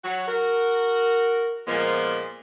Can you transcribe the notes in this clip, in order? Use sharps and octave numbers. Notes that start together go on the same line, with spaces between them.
F#3 F#4
F#4 A#4
A#2 F3 G#3 A#3 B3